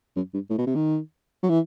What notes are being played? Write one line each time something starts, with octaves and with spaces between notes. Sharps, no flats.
F#2
G2
A2
B2
C3
D#3
F#3
E3